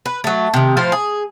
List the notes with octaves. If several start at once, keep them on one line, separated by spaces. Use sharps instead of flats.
B4
F#3 A3
C3 D#3
A2 F3 F4 C5
G#4